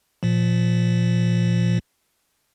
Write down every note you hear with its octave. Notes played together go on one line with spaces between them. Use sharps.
A#2 F3